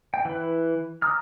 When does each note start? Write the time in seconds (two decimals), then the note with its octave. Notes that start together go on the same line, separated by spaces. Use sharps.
0.14 G5
0.25 E3 B4
1.02 A#5 D6 D#6 F6